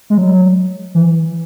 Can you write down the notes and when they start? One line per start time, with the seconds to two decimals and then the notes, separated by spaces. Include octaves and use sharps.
0.10 G#3
0.17 F#3
0.95 E3